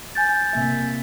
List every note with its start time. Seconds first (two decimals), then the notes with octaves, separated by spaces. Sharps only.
0.15 G#5 G6 A6
0.53 C3 A#3 E5